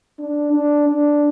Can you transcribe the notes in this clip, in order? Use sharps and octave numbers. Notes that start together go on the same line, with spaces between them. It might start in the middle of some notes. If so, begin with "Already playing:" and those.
D4
D4
D4